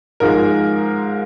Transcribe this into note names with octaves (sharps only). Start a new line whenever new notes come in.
G#2 F3 G#3 A#4